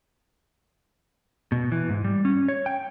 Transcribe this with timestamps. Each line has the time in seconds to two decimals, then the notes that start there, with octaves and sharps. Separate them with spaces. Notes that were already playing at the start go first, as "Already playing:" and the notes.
1.52 B2
1.72 E3
1.89 G#2
2.04 G3
2.25 C#4
2.48 C#5
2.66 G5